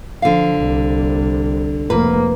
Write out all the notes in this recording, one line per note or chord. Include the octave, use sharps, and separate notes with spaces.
D3 F3 F5
C2
F1 A#3 B4